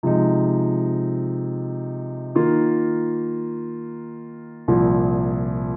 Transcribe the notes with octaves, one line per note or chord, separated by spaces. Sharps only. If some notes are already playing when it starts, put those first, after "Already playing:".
C3 F3 G#3 D#4
D#3 A#3 F4
C2 A#2 F3